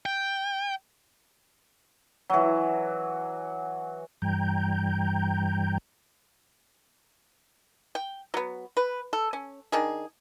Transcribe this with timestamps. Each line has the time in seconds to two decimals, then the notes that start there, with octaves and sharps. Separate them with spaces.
0.06 G5
2.30 E3 F#3
4.22 G2 E3 G3 G5 A#5 G6
7.95 G5
8.34 F#3 B3
8.77 B4
9.13 A4
9.33 C#4
9.72 D#3 D4 G#4